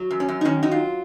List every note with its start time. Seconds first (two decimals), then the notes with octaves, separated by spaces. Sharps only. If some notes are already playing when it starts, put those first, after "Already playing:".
Already playing: F#3
0.11 F#2
0.20 C#4
0.28 F#2
0.41 D#4
0.45 D#3 C#4
0.63 F#3 D#4
0.71 F4